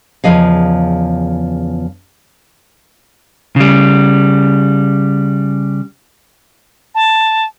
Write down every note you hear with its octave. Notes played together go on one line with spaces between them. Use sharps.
E2 C#3 F3 D#5 F5
C#3 G3
A5